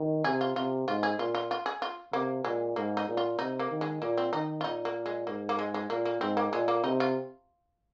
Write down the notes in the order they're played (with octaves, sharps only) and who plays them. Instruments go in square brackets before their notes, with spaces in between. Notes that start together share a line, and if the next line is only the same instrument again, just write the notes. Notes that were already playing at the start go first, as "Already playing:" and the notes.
Already playing: [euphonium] D#3
[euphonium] C3 [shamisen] G#4
[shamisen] F4
[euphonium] C3 [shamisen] F4
[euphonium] G#2 [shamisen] F4
[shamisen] G#4
[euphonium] A#2 [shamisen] F4
[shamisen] F4
F4
G#4
F4
[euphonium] C3 [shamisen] A#3
[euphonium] A#2 [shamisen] G#3
[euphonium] G#2 [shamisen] A#3
[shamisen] D#4
[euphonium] A#2
[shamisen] F4
[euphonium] C3 [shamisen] D#4
[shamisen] A#3
[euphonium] D#3
[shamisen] G#3
[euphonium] A#2 [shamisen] A#3
[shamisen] C4
[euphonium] D#3 [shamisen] D#4
[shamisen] F4
[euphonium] A#2 [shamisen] D#4
[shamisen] A#3
G#3
[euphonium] G#2 [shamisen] A#3
[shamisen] A#3
G#3
G#3
[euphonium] A#2 [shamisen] A#3
[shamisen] A#3
[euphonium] G#2 [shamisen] C4
[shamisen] A#3
[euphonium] A#2 [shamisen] G#3
[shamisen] A#3
[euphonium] C3 [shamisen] D#4
[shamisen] F4